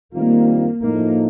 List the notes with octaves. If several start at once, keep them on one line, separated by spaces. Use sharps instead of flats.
D#3 G3 A#3 C4 F4
A2 F3 A3 A#3 D#4